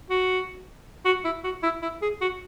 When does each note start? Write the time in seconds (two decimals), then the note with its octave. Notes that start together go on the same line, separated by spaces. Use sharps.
0.10 F#4
1.05 F#4
1.25 E4
1.44 F#4
1.63 E4
1.82 E4
2.02 G#4
2.21 F#4